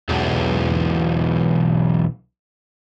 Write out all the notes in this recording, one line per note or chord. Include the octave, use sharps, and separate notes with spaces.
B1 E2